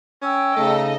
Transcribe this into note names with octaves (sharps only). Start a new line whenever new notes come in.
C#4 G5 E6
C#3 A3 D#4 A4 D#5